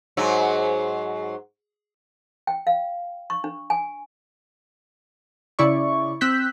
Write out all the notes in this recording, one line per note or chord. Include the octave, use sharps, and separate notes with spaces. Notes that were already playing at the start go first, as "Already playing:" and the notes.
G#2 F#3
G5
F5
C#6
D4
G#5
C#3 E4 D5 C#6
C4 E6 F#6 G6 B6